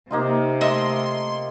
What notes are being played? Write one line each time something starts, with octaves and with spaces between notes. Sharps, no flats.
C3 A#3 D#4 F4
A3 D#5 E5 C6